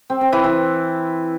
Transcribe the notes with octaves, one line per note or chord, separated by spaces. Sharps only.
C4
C4
E3
E3